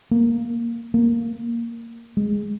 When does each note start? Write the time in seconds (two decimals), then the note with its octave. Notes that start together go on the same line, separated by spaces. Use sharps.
0.11 A#3
0.94 A#3
2.17 G#3